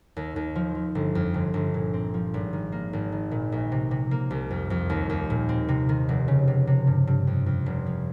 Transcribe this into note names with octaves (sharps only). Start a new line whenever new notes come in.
D#2
D#2
F3
F3
G1
F2
G1
G1
A#2
C4
F3
G#1
D#3
A#3
G#1
D#3
A#2
A#1
C3
C3
A#3
C2
F2
F2
D#2
D#2
A#2
C4
C3
D#3
F1
C#3
C3
C3
G2
G2
F2
F2
F1
F3